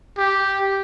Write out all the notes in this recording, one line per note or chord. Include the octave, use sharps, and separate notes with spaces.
G4